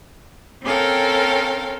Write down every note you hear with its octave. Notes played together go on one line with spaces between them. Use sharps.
C4 C#4 A4 A#4 F5 G5